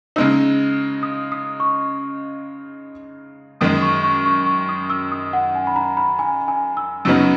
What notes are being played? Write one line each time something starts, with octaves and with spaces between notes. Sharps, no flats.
C#3 G#3 D#4 E6
D#6
D#6
C#6
F#2 D#3 G#3 D#6
C#6
C#6
C#6
C#6
D#6
E6
D#6
F#5
G#5
B5
A#5
B5
G#5
G#5
E6
F#2 C#3 F#3 B3 D#4 E6